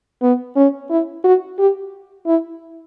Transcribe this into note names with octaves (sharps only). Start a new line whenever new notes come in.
B3
C#4
E4
F#4
G4
E4